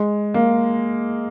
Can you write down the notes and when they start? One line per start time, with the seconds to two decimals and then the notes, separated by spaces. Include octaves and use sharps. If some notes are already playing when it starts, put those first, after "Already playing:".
Already playing: G#3
0.34 A#3